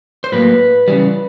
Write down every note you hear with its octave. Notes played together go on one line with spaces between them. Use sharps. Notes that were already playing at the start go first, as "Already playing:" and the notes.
C5
A2 F#3 A#3 B4
C#3 E3 G3